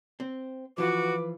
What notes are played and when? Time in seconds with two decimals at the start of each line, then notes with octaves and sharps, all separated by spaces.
0.20 C4
0.78 E3 F3 F4 F#4 B4 D6